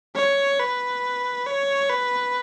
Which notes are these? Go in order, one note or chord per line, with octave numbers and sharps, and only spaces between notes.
C#5
B4
C#5
B4